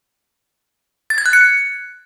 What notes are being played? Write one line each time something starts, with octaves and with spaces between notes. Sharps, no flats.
A6
G#6
F#6
C#7